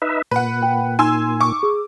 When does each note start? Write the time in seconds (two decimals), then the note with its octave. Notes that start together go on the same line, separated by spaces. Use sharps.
0.02 D#4 B4 E5
0.31 A#2 B4 F#5
0.62 G5
0.99 D#4 G#5 C6 E6
1.41 C#6 D6
1.63 G#4